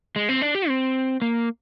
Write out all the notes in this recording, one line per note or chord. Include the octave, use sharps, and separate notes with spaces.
G#3
C4
D4
G4
C4
A#3